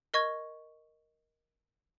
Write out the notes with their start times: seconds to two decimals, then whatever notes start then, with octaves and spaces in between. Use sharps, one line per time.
0.14 A#4 D#5 C#6 G#6